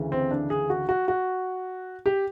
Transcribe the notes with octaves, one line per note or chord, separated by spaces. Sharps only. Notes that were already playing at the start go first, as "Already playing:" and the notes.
Already playing: D2 C#3 E3
C4
D4
G#4
F#4
F#4
F#4
G4